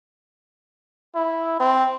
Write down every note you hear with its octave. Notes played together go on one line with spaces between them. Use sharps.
E4
C4